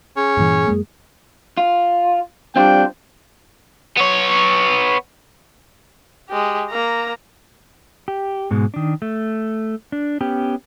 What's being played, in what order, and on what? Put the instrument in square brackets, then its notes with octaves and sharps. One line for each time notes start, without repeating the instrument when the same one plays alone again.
[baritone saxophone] C#4 [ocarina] G#4
[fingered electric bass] G2 A#2 E3
F#2 G#3 A#3
[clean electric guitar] F4
[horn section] G3 D4 G5 [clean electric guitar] C4 F4 C5
[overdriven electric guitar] B3 C#5
[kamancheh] G#3 G4
A#3 A#5
[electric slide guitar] G4
G#2 B2 G#3
D#3 D4
A3
D4
B3 C#4 G4